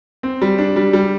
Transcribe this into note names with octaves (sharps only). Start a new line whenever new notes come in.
C4
G3
D4
G3
G3